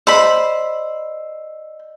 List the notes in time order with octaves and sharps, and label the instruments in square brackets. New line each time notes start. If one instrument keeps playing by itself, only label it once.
[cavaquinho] C5 B5 [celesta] D5 D#5 E6